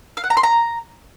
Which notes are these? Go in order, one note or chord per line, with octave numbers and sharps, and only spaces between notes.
F5
F#5
A#5
C6
A#5